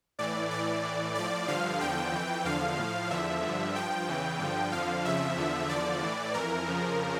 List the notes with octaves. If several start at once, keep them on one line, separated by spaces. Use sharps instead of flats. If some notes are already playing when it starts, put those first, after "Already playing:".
A2 E3 D5
A2 E3 D5
A2 E3
A2 F3 D5
G2 D3 F3 F5
E2 D3 F3 G5
F2 E3
E2 D3 F3 F5
A2 F3
E2 D3 F3 E5
G2 D3 F3
G2 F3 G5
E2 C#3 E3
G2 D3 F3
F2 D3 F3 F5
F2 C#3 F3 E5
E2 D3 F3
E2 D3 F3 D5
A2 E3
F2 E3 A#4
F2 C#3 F3